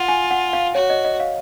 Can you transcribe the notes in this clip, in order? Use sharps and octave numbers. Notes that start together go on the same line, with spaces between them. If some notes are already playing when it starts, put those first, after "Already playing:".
Already playing: F4 F#5
G#5
F#5
F5
F#4 C#5
D#5
D#5
F5